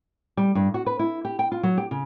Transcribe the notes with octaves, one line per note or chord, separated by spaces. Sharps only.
G3
G2
F#4
B4
E4
G4
G5
F4
F#3
G4
C#3